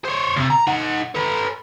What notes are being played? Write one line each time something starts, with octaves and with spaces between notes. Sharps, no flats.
C5 C#5
D2 C3
A#5
D#4 F#5
A4 B4